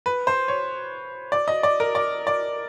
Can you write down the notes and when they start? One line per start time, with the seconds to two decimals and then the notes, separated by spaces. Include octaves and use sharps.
0.06 B4
0.27 C5
0.48 C#5
1.32 D5
1.48 D#5
1.63 D5
1.80 A#4
1.95 D5
2.27 D5